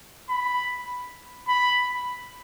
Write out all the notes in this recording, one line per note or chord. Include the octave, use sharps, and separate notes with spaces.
B5
B5